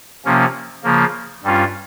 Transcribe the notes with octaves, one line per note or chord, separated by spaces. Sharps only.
C3 F3 A#3 C#4
C#3 F3 A#3
G2 G3 C#4 F4